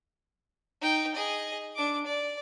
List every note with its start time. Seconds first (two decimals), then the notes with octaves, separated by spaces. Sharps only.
0.81 D#4 G5
1.15 G#4 D#5
1.75 D4 D6
2.06 D5